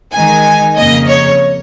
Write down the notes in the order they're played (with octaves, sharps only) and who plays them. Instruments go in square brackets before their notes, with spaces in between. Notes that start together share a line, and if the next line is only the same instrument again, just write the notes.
[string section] D#3 G#3 D#4 G#5
F2 C#3 A#3 D#5
C#5